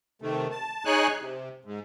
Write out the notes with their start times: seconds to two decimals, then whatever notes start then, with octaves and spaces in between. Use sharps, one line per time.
0.22 C3 D#3 A3
0.51 A5
0.85 D#4 G#4 C#5 G#5 F#6
1.19 C3
1.65 G#2